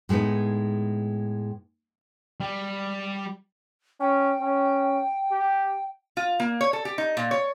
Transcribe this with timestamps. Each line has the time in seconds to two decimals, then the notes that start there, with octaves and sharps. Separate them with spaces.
0.09 A2 G#3 A3 B3 D#4
2.40 G3
4.00 C#4 G5
4.41 C#4
5.31 G4
6.17 F4
6.40 A#3
6.61 C#5
6.73 A4
6.85 G4
6.98 D#4
7.17 A#2
7.31 C#5